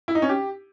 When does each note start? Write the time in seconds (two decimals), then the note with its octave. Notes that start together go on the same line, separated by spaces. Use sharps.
0.08 E4
0.15 D#4
0.22 C#4
0.29 G4